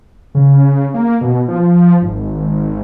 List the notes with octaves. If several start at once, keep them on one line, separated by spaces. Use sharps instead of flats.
C#3
A#3
B2
F3
G#1